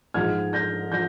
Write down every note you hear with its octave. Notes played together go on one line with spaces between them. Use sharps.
G#2 F3 G#3 F6 G#6
G6 A#6
F3 G6 A#6